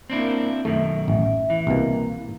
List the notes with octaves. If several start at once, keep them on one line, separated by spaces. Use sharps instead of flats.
A#3 C4 D4 E4
F#2 B2 D#3 A3 E5
A1 E5
E3
C2 B2 A#3